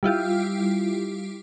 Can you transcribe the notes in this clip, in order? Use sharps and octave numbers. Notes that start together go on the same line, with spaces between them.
G3 E4 F4 G4